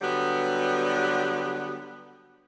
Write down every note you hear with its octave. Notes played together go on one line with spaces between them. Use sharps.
D3 F#3 G3 B3